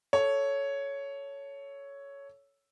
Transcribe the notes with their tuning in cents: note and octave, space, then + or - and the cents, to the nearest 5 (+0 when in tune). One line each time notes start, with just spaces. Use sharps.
A4 +0 C#5 +5